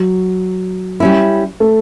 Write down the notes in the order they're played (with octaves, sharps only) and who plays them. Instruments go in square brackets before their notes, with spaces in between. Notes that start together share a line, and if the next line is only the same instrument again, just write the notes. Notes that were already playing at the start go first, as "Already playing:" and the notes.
Already playing: [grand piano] F#3
[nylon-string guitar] G3 C#4 E4
[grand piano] A3